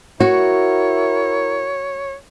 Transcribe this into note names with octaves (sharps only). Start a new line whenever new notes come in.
E4 F#4 A#4 C#5